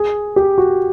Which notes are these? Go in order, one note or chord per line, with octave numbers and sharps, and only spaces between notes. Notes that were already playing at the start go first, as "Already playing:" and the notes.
Already playing: G#4
G4
F#4